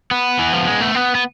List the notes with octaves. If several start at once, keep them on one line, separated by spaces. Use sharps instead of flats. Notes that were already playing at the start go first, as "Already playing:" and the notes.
B3
E3
F3
G#3
A3
B3
B3